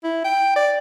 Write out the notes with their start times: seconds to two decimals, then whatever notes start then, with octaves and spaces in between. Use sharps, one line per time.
0.04 E4
0.24 G5
0.56 D5